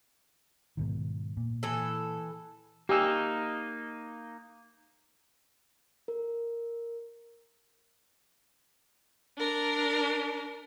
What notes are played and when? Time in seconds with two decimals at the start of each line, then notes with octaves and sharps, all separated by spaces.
0.77 G#2 B2 D#3
1.37 A#2
1.63 E3 A4
2.89 A#3 D#4 G4 G#5 E6
6.08 A#4
9.38 D4 A#4